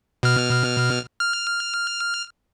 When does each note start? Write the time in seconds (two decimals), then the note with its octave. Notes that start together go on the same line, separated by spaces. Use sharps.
0.23 B2 F6
1.20 F6